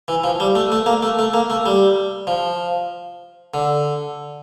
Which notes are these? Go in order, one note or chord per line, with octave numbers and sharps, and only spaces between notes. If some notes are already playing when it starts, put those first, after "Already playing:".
E3
F3
G3
A3
A3
A#3
A3
A3
A#3
A3
G3
F3
D3